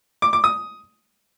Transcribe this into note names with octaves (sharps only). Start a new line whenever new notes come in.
D6
D6
D#6